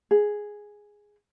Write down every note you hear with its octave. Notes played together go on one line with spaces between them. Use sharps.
G#4